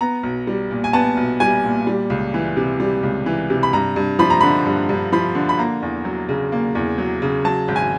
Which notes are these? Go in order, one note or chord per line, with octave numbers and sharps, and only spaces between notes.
B3 A#5
B1
G3
A#2
G#5
B3 A5
B1
G3 G#5
A#2
G3
C#2
E3
C3
G3
C#2
E3
C3
B5
G2 A#5
G2
F3 B5
A#5
D3 B5
G2
G2
F3 B5
D3
B5
A#3 A#5
E2
F#3
C#3
A#3
E2
F#3
C#3
F#3 A5
G#1
G#5